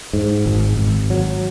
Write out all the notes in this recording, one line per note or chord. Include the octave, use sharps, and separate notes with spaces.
G#2
G#1
G#1
F#3